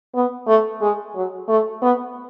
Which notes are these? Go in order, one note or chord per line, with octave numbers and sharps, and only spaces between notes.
B3
A3
G#3
F#3
A3
B3